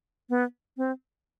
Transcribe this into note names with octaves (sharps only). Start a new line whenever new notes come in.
B3
C4